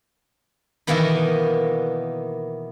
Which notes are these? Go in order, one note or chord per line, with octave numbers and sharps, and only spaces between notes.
B2 D#3 E3 A#3 B3 D#4